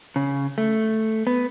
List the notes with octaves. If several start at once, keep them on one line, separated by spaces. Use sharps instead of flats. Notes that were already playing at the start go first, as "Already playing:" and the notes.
C#3
A3
B3